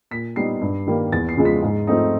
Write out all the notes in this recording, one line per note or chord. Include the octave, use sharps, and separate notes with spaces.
A#2 B6
G3 B3 D#4 C7
G2
D#3 G3 A#3
E2 A6
C7
C#3 F3 G#3
B6
G#2
F3 A3 C4 D#4